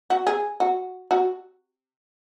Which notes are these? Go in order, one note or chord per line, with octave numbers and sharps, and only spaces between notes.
F#4
G#4
F#4
F#4